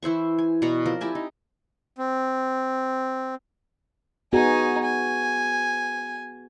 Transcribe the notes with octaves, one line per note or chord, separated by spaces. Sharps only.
E3 E4 C5 C#6
G#5
B2 D5 A#5 C#6
F3 C4 A#4
E4 G4 G#5 A5
D#4
C4
B3 D#4 F#4 G#4 G#5
G#5